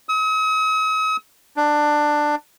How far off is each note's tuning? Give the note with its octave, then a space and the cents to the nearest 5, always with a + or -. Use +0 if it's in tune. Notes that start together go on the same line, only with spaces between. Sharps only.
D#6 +45
D4 +15